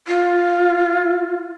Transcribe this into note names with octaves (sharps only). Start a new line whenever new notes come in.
F4